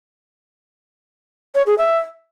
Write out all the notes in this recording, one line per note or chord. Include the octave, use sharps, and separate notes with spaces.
C#5
G#4
E5